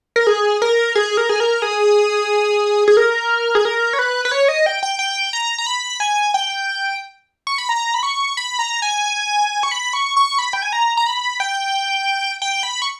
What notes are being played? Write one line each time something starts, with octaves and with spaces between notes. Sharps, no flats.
A#4
G#4
A#4
G#4
A#4
G#4
A#4
G#4
G#4
A#4
G#4
A#4
C#5
B4
B4
C#5
D#5
G5
G5
G5
A#5
A#5
B5
G#5
G5
C#6
B5
A#5
B5
C#6
B5
A#5
G#5
C#6
B5
C#6
C#6
B5
G5
G#5
A#5
A#5
B5
G5
G5
B5
C#6